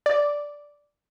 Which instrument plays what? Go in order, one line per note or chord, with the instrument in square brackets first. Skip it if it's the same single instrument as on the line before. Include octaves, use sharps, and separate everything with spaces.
[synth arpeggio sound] D5